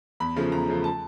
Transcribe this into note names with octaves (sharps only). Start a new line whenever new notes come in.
E2 B5
C#3 F3 A3
E2 A#5
C#3 F3 A3
A5